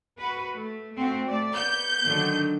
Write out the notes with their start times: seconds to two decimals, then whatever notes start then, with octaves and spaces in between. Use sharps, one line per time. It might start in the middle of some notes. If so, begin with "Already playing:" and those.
0.17 F#4 B4
0.53 A3
0.94 A3 C4 F#4
1.25 A3 D5
1.55 B3 G6
2.03 D3 D#3 F#3